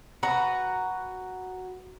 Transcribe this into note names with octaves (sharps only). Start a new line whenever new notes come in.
F#4 B4 A#5